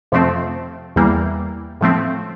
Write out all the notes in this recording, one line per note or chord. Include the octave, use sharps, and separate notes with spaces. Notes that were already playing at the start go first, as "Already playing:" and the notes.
F2 C3 F3 A3 C4
E2 E3 G3 A#3
A2 F3 A3 C4